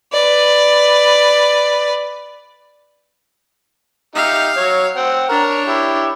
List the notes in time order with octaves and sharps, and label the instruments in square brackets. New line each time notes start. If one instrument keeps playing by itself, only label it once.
[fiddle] B4 D5
[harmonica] D#4 G4 E5 [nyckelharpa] F5
[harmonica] F#3 C#5
C4 F#5 G5
[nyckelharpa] D4 C#5 [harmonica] A#4 A#5
[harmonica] E4 G4